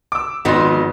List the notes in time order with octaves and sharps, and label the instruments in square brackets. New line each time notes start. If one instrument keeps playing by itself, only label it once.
[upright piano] D6 E6
[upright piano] G#1 C6 [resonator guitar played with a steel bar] F3 B3 D#4